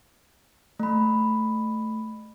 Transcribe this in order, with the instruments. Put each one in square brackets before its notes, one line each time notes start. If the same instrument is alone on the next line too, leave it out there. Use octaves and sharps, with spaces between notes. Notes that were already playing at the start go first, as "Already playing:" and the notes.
[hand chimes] A3 B5